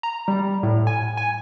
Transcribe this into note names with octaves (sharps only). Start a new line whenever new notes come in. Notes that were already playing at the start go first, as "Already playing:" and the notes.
A#5
G3
A2
G#5
G#5